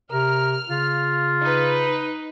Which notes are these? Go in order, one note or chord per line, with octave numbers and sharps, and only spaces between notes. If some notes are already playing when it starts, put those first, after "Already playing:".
C3 A#4 F6
C#3 F4
D#4 B4